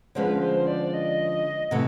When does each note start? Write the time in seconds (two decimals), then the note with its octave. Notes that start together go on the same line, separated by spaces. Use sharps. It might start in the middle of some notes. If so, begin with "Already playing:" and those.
0.15 D3 F3 G#3 C#4 B4 C5
0.42 C5
0.67 D5
0.93 D#5
1.71 C3 E3 A3 F#5